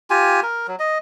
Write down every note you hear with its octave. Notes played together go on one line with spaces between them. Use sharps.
F4 G4 G#5
A#4
F#3
D#5